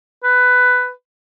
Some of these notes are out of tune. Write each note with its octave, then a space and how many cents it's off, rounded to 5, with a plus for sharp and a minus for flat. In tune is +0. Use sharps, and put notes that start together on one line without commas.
B4 +10